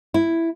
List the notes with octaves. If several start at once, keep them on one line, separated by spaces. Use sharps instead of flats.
E4